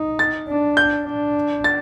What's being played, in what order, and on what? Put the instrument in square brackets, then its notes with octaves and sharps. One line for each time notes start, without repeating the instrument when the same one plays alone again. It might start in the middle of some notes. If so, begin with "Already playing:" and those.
Already playing: [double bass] D#4
[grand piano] A6
[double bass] D4
[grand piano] G6
[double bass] D4
[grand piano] A6